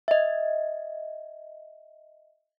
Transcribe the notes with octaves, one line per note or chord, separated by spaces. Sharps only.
D#5 E5